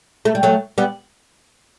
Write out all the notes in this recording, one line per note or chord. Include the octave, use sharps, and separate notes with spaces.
A3
G3
F#3 A3
G3 B3